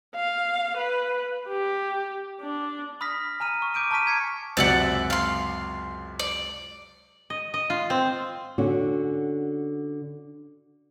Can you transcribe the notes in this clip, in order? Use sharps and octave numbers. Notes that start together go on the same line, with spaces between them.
F5
B4
G4
D4
B5 D#6 F6 A#6 B6
G#5 A#5 F6 D#7
C#6
D6 G6 D7 D#7
A5 A#5 C#6 F6 B6 D#7
A#5 G#6 B6 C#7
C#2 F#2 C3 D5 E5 F#5
F5 C6
D5
D#5
D#5
F4
C4
D3 C#4 F#4